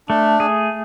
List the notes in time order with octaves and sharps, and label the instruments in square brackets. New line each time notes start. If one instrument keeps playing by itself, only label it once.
[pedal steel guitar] A3 [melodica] D4
[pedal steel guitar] G#4